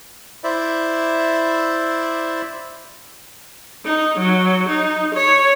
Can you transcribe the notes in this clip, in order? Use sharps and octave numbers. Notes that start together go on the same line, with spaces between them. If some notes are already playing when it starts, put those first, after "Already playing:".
E4 C5 D5 E5
D#4
F#3
D#4
C#5